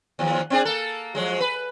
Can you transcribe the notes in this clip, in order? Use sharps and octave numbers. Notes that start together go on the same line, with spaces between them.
D#2 F3
C4 D4 G#4
A#3 A4
F3 F#3 G#3
B4